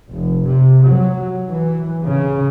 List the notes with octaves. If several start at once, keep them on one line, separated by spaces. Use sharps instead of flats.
F1
C3
F#3
E3
C#3